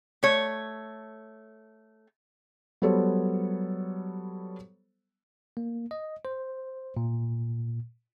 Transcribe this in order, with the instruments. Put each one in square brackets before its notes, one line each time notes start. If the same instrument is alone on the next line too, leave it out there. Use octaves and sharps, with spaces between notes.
[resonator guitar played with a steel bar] A3 C#5
[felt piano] F#3 G3 B3 A4 C5 C#5
[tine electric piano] A#3
D#5
C5
A#2